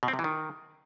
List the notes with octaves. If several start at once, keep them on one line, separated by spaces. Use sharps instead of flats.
B2
C4
C3
E3
D#3